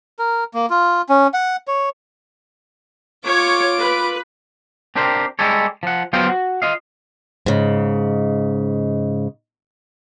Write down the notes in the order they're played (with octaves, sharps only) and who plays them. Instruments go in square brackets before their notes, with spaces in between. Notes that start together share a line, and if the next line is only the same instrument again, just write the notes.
[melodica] A#4
A#3
F4
C#4
F#5
C#5
[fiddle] F4 D6 [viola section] C#5
[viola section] B4
[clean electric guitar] C4 D4 G4 A#4 C5
G3 G#3 G4 A4 C#5
F3 F#5
F#3 B3 F4 C5 F5 G5
F#4
F4 D#5 F5
[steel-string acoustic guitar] G#2 C#3